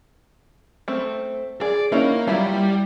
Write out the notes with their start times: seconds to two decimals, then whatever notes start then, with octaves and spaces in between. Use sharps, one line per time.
0.88 A3 C4
1.61 G#4 D5
1.92 A#3 C#4 D#4 E4
2.27 F#3 G3 E4 F4